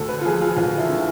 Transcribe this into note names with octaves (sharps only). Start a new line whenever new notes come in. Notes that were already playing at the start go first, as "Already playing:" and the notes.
Already playing: D2 A4
B4
F4
F3 G#4
F4
D2 F4
E4
D3